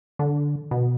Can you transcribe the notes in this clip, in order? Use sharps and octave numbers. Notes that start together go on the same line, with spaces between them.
D3
B2